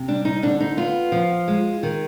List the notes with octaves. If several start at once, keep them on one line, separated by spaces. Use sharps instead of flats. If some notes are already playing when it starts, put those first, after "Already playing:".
Already playing: C3
G3 D4
D#4
D3 D4
D#4
B3 F4
F3
G#3
D#3